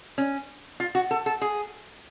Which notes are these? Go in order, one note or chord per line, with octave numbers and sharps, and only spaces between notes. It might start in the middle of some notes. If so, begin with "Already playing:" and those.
C#4
F4
F#4
A4
A4
G#4